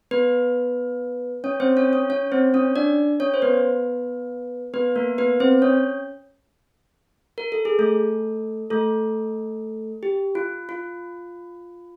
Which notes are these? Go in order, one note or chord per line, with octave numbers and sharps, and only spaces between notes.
B3 B4
C#4 C#5
C4 C5
C#4 C#5
C#4 C#5
C#4 C#5
C4 C5
C#4 C#5
D4 D5
C#4 C#5
C5
B3 B4
B3 B4
A#3 A#4
B3 B4
C4 C5
C#4 C#5
A#4
A4
G#4
A3 A4
A3 A4
G4
F4
F4